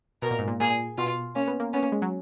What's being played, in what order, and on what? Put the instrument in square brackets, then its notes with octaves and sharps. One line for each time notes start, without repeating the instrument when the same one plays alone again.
[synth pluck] B2 [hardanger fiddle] A#4
[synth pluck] A#2
G#2
A#2
[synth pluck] A#2 [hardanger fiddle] G#4
[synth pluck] B2 [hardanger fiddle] F4
[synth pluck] A#3 [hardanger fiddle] C#4
[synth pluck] B3
A#3
[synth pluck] B3 [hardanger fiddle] C#4
[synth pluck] A#3
G#3
F#3